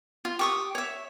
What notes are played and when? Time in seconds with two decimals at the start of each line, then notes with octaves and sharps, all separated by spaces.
0.25 F4
0.39 G4 C#6 D#6
0.75 C#5 E5